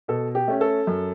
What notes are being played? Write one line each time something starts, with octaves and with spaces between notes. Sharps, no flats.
B2 A4
G4
A3 C#4
A4
F#2